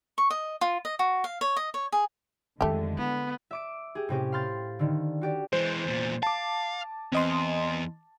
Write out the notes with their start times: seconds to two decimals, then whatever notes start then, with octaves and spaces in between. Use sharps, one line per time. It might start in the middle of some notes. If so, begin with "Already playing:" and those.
0.18 C#6
0.30 D#5
0.61 F4
0.85 D#5
0.99 F#4
1.24 F5
1.41 C#5
1.56 D#5
1.74 C#5
1.92 G#4
2.61 F2 D3 D#3 G#3 A3 G4
2.98 B3 E4
3.51 E5 D6 D7
3.95 G4 G#4
4.09 A2 C3 C#4 G4
4.32 F5 B5 C6 F6 G6 A6
4.79 D3 D#3
5.21 F#4 G4 D5
5.53 E3 G#3 C5
5.85 E2 A#2
6.23 F5 A5 D6
7.12 E2 C4 D#5 C6